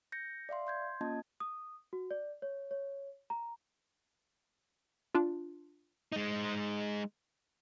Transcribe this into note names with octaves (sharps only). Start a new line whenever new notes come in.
G6 A#6 C#7
D5 E5 F5 C6
C6 G6 G#6
A#3 C#4 F4 D#5 A5 G#6
D#6
F#4
D5
C#5
C#5
A#5
D4 F4
G#3 D#4